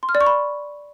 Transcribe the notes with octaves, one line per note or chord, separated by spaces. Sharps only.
C6
F6
D5
C#6
B5